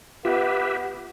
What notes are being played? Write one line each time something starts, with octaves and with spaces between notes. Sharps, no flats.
B3 F4 G4 B4 E5